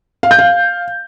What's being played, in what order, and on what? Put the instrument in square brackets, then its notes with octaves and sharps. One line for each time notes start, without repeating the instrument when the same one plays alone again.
[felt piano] F5
G6
F5